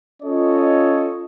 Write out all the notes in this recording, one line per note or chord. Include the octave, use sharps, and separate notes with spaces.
C#4 F4 A4 C#5 D#5